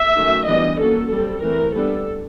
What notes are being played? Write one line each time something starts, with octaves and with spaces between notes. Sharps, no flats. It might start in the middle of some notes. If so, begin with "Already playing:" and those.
Already playing: E5
D#3 F#3 A3 C#4
E3 G3 B3 D4 D#5
F#3 A#3 C#4 A4
G3 C4 A4
E3 A3 C4 A#4
G3 B3 D4 A4